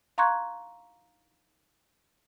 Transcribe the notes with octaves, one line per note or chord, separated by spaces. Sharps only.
F5 A#5 C6 C#6 F#6 G#6